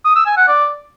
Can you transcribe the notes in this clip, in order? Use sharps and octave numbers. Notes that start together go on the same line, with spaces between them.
D#6
E6
G#5
F#5
D5